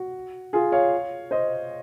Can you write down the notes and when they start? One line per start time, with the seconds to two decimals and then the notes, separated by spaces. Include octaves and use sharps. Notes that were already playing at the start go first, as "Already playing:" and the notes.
Already playing: F#4
0.53 F4 G#4
0.72 C#5 F5
1.31 C5 D#5